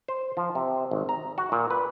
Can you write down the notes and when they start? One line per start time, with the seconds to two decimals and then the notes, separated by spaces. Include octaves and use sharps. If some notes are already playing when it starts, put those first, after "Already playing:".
0.08 C5
0.37 F3
0.55 C3
0.91 G#1
1.09 A#5
1.38 F#4
1.52 A#2
1.70 B4